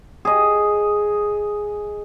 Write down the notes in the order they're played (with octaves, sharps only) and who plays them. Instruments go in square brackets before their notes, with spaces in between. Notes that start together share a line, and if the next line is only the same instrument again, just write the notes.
[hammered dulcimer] G#4 D#5